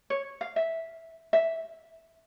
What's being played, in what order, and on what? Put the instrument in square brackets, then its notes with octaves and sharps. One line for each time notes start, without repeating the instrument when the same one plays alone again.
[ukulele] C#5
F5
E5
E5